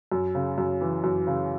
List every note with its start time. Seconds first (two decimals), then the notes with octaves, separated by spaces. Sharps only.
0.12 F#2
0.35 C#3
0.58 F#2
0.81 E3
1.04 F#2
1.27 C#3